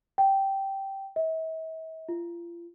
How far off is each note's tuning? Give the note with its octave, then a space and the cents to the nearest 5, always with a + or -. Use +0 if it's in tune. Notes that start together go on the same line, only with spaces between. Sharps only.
G5 -10
E5 -45
F4 -35